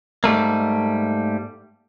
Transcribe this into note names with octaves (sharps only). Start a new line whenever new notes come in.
G#2 G3 A3 A#3